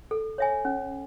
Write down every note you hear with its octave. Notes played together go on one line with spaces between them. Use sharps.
A4
C#5 E5 G#5
C#4